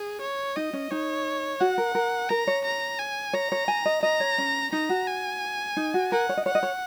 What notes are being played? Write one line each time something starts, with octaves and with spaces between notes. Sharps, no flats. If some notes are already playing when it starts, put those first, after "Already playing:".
Already playing: G#4
C#5
D#4 D#5
C#4
D#4 C#5
F#4 F#5
A#4
A#4
A#4 A#5
C#5
A#5
G#5
C#5 A#5
C#5
G#5
D#5
D#5 A#5
C#5
C#4
D#4 A#5
F#4
G#5
D#4
F#4
A#4 F#5
C#5
D#5
C#5 F#5
D#5
C#5